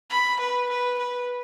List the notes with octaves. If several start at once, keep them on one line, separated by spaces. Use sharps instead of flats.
B5
B4
B4
B4